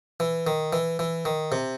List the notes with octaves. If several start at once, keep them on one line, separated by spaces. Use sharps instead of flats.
E3
D#3
E3
E3
D#3
C3